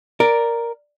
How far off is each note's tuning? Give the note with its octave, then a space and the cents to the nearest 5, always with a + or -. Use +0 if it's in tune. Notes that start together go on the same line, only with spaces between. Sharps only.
A#4 +0 D5 +0